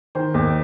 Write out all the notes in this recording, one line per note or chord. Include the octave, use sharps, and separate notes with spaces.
D#3 C5
D#2